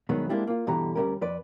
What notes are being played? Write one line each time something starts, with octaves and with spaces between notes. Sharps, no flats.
G2 B2 D#3 F#3 G#3 B3
G#3 A#3 C4 D4 E4 G4
A#3 F4
G2 B2 D3 E3 G4 A#5
D2 G2 G3 C#4 A#4
F2 B4 D5